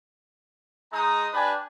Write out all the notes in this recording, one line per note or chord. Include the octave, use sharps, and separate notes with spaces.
G#3 D#4 A#5 D#6
D4 G4 B4 G#5